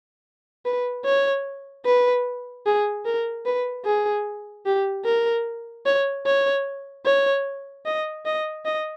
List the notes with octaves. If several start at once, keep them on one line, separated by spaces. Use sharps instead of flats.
B4
C#5
B4
G#4
A#4
B4
G#4
G4
A#4
C#5
C#5
C#5
D#5
D#5
D#5